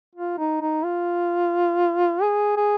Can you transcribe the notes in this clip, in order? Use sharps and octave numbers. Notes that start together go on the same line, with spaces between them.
F4
D#4
D#4
F4
G#4
G#4